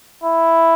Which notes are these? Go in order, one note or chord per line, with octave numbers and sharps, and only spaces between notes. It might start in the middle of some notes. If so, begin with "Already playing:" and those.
E4